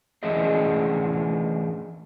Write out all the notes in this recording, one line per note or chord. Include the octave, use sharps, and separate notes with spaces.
E3 A3 C#4 D4 G#4 D#5